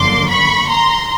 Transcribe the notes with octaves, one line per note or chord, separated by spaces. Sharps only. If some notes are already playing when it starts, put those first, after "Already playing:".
Already playing: G1 F#2 D3 F3 A#3 C6 D6
B5 C#6
A#5 C6